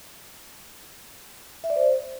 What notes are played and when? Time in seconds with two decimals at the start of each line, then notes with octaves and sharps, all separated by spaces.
1.64 E5
1.70 D5
1.76 C5